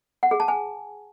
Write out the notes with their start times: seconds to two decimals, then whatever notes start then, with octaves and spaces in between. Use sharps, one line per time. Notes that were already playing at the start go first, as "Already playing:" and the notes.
0.23 F#5
0.31 G#4
0.40 A5
0.48 G#5